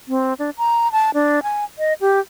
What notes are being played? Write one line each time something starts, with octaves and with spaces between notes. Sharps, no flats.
C4
D4
A#5
A5
D4
G#5
D#5
G4